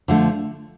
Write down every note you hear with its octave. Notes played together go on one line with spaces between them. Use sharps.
D3 F3 A3